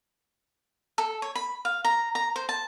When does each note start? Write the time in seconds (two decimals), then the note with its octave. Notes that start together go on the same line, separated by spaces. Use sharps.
0.98 A4
1.22 C#5
1.35 B5
1.65 F5
1.84 A#5
2.15 A#5
2.36 C5
2.49 A5